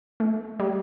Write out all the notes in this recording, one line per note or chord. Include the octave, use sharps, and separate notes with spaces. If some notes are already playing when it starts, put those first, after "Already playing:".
A3
G3